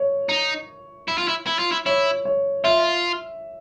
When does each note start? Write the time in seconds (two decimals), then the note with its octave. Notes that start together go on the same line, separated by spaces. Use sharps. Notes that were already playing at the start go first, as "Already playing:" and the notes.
Already playing: C#5
0.29 D#4
1.08 E4
1.18 F4
1.28 E4
1.47 E4
1.59 F4
1.72 E4
1.86 E4 C#5
2.25 C#5
2.64 F4 E5